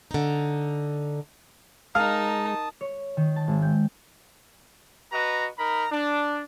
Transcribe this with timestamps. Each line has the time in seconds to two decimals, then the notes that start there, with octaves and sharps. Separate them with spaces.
0.11 D3 D#4
1.95 G#3 D#4 A#4 F5 A5 D#6
2.81 C#5
3.17 D#3
3.36 A5
3.48 G#1
3.62 G5
5.12 F#4 B4 D#5 A#5
5.58 D#4 A#4 A#5 B5
5.91 D4